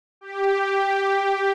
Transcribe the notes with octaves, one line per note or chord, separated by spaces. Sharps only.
G4